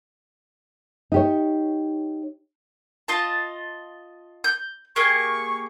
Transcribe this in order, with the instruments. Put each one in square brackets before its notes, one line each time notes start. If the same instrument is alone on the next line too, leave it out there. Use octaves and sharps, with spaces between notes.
[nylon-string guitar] D#4 G4 C#5
[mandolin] F4 D#5 A5
G6
[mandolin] A#3 G4 G#4 [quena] C#6